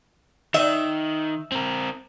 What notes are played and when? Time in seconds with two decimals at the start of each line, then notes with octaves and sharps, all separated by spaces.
0.54 D#3 D#4 E5
1.52 C4 A#4